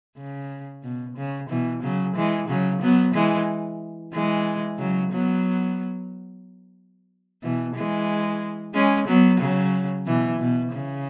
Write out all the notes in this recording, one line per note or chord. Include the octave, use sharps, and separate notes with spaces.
C#3
B2
C#3
B2 E3
C#3 F#3
E3 G#3
C#3 F#3
F#3 B3
E3 G#3
E3 G#3
C#3 F#3
F#3 B3
B2 E3
E3 G#3
G#3 C#4
F#3 B3
C#3 F#3
B2 E3
B2
C#3